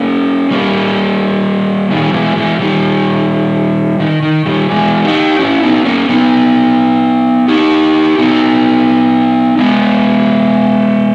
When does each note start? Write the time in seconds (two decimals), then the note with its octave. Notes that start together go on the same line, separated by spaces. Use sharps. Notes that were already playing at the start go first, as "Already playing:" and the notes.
Already playing: A#3 C#4
0.51 G3 A#3
1.91 D#3 G3
2.14 E3 G#3
2.36 E3 G#3
2.60 D#3 G3
4.00 D#3
4.23 D#3
4.46 D#3 G3
4.70 E3 G#3
5.04 D#4 G4
5.39 C#4 E4
5.63 B3 D#4
5.85 A#3 C#4
6.09 B3 D#4
7.48 D#4 G4
8.18 B3 D#4
9.58 G#3 B3